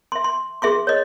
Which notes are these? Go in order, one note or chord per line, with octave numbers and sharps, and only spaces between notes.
E5 C6
C6
G#4 E5 C6 C#6
C#5 D#5